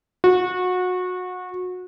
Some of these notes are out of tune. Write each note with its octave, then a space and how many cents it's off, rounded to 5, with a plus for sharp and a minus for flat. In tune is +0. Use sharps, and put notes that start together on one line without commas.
F#4 -25